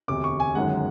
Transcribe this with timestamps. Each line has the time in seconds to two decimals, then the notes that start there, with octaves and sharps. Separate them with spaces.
0.08 E1 D2 C3 D6
0.24 C#6
0.40 G#5
0.55 G1 F#2 D#3 G#3 F#5